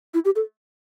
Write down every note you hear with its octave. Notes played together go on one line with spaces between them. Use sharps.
E4
G4
A4